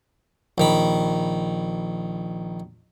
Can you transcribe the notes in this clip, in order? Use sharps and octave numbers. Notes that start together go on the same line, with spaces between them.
A#1 D#3 B5